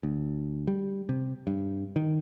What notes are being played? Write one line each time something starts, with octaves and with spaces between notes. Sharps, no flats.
D2
G3
C3
G2
D#3